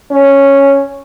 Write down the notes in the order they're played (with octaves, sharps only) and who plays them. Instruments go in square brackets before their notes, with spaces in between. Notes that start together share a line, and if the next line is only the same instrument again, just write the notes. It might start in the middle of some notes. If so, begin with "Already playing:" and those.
[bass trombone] C#4